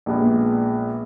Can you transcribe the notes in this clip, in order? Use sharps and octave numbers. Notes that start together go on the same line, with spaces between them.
A#1 A#2 G#3 B3